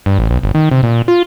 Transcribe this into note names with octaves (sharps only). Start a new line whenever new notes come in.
G2
A1
B1
G1
D#3
C3
A#2
F4